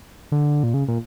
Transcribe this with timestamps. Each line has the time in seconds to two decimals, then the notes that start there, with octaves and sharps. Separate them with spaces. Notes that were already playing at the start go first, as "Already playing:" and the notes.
0.32 D3
0.63 A#2
0.74 C#3
0.88 A#2